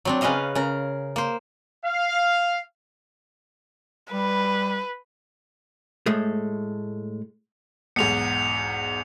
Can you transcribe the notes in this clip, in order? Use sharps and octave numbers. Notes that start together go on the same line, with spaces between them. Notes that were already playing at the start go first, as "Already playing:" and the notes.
F#3 C4 D4
C#3 C#4 B4 D#5 F5 A#5
C#3 A#4
A#3 C5
F5
G3 B4
A2 G#3 A3
B1 E2 G#2 C#7 F7